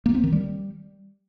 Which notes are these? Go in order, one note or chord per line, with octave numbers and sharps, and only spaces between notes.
A#3
C4
D#3
G3